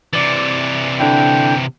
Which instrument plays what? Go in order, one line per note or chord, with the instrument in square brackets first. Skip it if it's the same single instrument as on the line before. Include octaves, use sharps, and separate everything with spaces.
[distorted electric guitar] C3 E3 [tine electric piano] D5 A6
[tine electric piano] D3 D4 E4 [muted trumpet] G5